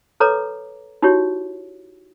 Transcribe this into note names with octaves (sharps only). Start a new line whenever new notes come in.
A4 B4 C#5 A#5 D6
D#4 E4 F#4 G4 C#5